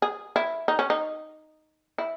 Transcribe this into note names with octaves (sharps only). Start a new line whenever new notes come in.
G#4
E4
D#4
C#4
D#4
E4